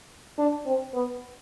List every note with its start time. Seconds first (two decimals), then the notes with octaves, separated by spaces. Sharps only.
0.38 D4
0.66 C4
0.94 B3